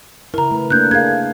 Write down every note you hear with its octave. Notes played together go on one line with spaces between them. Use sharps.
C#3 E4 A#4 A#5
A3 B4
A3 A#3 D4 F#6 G6
D4 G#4 A#4 F5 G#6